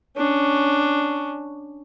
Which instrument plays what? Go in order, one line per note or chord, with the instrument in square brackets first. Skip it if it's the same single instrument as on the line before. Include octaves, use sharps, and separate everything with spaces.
[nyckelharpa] C#4 D4